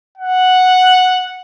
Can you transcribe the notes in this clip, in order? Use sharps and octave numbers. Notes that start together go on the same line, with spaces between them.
F#5